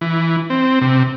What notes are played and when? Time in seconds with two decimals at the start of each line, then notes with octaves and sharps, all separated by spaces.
0.01 E3
0.50 C4
0.81 C3